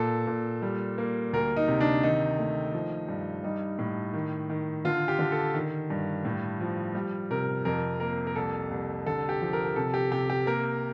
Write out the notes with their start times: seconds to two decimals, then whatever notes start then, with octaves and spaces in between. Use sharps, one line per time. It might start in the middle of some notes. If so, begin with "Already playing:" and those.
Already playing: A#2 A4
0.27 A#2
0.62 G3
0.98 A#3
1.33 D2 A#4
1.57 D#4
1.68 C3
1.80 D4
2.03 D#3 D#4
2.38 A3
2.73 F3
3.08 G2
3.44 G3 D#4
3.79 A2
4.14 D#3
4.50 D#3
4.85 D3 F4
5.08 G4
5.19 D3
5.32 A4
5.54 D#3
5.90 G2
6.25 A2
6.61 F3
6.95 G3
7.31 C3 A#4
7.65 F2 A#4
8.00 A#3 A#4
8.27 A#4
8.36 C2 A4
8.71 C2
9.06 D3 A4
9.29 G4
9.41 F3
9.53 A#4
9.76 C3 A4
9.94 G4
10.11 C3 G4
10.30 G4
10.46 A#3 A#4